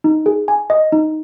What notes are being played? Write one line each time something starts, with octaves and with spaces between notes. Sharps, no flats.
D#4
G#4
G#5
D#5
D#4